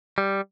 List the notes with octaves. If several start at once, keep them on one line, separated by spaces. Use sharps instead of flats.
G3